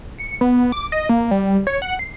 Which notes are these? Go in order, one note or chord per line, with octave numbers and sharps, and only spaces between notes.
C#7
B3
D6
D#5
A#3
G3
C#5
F#5
C7